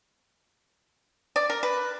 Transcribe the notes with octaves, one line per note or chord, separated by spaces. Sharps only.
D5
A#4
B4